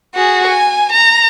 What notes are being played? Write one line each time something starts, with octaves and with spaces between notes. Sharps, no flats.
F#4 G#4
G#5
A#5